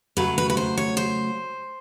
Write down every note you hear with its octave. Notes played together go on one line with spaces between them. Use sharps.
C#3 F#3 A3 B4
B4
B4
C5
C#5
C5